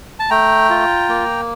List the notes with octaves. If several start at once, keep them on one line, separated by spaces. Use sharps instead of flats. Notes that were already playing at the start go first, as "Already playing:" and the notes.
A5
A3 G5 A#5
F4
A#3